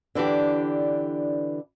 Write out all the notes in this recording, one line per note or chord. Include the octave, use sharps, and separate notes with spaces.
D3 E3 D4 G4